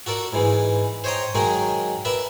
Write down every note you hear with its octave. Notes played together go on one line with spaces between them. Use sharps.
F#4 A4 A#4 D5
G#2 E3 G#3
C5 C#5 D#5 G5 A#5
D#3 F#3 G#3 D#4 G#4 A#4
A#4 B4 D5 E5